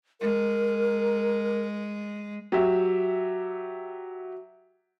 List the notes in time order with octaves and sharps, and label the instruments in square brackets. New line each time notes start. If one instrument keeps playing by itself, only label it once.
[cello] G#3 [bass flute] A#4
[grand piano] F#3 G4 E5